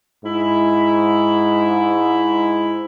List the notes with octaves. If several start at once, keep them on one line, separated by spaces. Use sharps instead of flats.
G#2 E4